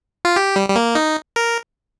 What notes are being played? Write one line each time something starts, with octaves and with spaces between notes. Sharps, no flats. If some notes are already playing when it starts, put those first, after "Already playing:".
F4
G4
G3
G3
A#3
D#4
A#4